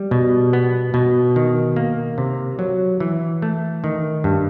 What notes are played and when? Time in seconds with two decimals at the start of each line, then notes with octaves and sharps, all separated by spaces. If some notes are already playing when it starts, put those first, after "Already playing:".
Already playing: G3
0.11 B2
0.53 B3
0.94 B2
1.36 D#3
1.76 A#3
2.18 C3
2.59 F#3
3.00 E3
3.42 A3
3.84 D#3
4.24 G2